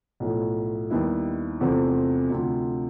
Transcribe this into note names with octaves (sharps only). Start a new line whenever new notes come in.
B1 A2 F3 A3
D#2 D#3 G3 B3 E4
E2 C3 F3 A3 C4
D2 C3 F3